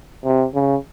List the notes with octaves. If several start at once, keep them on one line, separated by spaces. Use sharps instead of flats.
C3
C#3